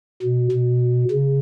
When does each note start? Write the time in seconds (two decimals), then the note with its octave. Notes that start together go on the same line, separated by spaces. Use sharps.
0.22 B2
0.51 B2
1.11 C#3